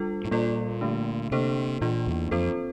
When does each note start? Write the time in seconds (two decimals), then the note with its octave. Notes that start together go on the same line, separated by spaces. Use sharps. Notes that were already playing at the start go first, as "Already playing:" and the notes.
Already playing: G3 D4 F4 A4
0.25 A2
0.31 A#2 G3 A#3 F4 A4 D5
0.81 D3 A3 D4
1.31 C3 A#3 D4 A4 C5
1.81 A#2 E3 A#3 D4 F4
2.07 E2
2.31 F2 C4 F4 A4 C5